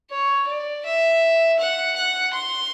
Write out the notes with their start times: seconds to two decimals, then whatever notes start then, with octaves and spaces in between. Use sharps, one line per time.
0.10 C#5
0.47 D5
0.85 E5
1.59 F#5
1.96 F#5
2.33 C6